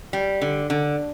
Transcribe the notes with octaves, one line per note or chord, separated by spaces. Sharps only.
G3
D3
D3